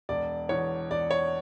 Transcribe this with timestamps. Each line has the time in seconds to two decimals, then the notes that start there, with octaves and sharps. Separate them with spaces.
0.09 E1 D5
0.49 E2 C#5
0.90 E1 D5
1.11 C#5